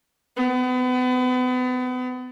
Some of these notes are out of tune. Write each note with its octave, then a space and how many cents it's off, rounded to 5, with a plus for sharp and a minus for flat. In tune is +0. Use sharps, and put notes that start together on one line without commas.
B3 +35